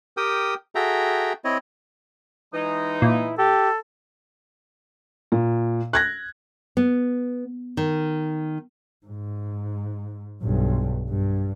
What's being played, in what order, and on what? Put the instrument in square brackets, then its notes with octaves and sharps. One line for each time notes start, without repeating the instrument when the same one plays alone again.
[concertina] G4 A#4 G5 D#6
F#4 G#4 A4 E5 G5 A#5
C4 E4 C#5 D#5
[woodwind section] E3 G#3 D#4
[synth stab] A#2 [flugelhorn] E4
[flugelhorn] G4 [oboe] A4
[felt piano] A#2
F#6 G#6 A#6
[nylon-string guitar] B3
D#3
[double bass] G#2
B1 G2
G2